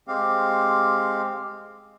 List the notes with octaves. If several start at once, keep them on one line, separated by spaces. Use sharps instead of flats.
G#3 C4 G4 F5